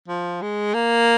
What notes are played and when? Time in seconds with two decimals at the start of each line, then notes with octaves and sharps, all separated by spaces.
0.08 F3
0.42 G#3
0.74 A#3